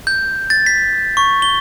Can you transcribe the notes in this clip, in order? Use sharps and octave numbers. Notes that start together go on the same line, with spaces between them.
G6
A6
B6
C#6
G7